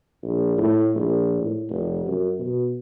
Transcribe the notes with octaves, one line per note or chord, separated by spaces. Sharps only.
A#1
A2
A#1
A2
F1
F#2
B2